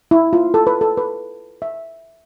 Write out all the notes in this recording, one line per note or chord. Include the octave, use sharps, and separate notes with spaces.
E4
F4
A4
B4
A4
B4
E5